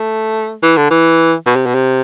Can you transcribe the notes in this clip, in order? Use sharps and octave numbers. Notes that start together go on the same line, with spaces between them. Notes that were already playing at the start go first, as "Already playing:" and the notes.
Already playing: A3
E3
D3
E3
B2
C3
B2
C3